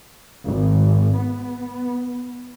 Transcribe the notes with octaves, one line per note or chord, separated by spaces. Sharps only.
G#1
B3